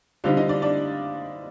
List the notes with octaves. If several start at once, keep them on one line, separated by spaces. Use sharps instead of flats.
D3 G3 C4 D#4 F4 F5
D#4 D#5
D4 D5
D4 D5